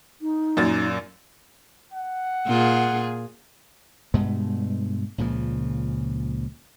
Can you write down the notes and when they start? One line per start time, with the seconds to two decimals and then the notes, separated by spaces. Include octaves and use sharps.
0.21 D#4
0.57 F#2 A#2 A6
1.93 F#5
2.46 A#2 F4 G#4
4.14 G2 B2 G#3 A3
5.18 C#2 A#2 C#3 F3